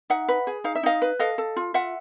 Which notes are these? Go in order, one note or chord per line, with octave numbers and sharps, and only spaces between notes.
D#4 E5 F#5
B4
G#4
D#4 F5
E5
D#4 D#5 F5
B4
A4 D#5 F5
A4
F4
F4 E5 F#5